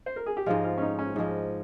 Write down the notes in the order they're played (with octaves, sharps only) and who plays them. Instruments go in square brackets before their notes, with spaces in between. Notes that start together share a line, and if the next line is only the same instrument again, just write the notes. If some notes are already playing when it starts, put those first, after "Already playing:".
[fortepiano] C5
A#4
G#4
G4
[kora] G#2 F3 G#3 [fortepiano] F4
[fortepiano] F4
C#4
D#4
C#4
[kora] G#2 F3 G#3